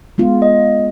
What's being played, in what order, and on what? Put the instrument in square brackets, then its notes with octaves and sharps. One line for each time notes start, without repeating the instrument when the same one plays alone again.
[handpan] G#3 B3 F4
[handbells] D#5